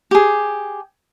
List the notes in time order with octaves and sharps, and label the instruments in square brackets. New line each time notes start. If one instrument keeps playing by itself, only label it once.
[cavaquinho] G4 G#4